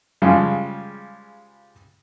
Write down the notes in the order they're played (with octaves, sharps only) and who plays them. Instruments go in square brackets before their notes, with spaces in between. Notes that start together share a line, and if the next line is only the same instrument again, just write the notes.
[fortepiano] C#3 F3 G3 G#3